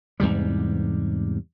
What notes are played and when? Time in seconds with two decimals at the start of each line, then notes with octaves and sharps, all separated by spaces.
0.20 E2 G#2 C3 G3